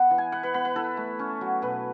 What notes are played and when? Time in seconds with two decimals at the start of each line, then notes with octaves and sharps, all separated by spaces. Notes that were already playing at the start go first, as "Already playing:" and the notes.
Already playing: B3 F#5
0.11 E3
0.18 G#5
0.32 B3 F#5
0.43 B4
0.54 B3 B4
0.65 B4
0.76 E4 A4
0.97 A3
1.19 C#4
1.41 F#3
1.62 B2 B4